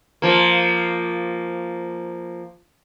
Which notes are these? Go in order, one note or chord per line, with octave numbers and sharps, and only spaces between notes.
F3 A#3